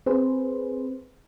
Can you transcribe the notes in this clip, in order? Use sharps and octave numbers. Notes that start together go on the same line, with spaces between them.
C4 G#4 B4 C5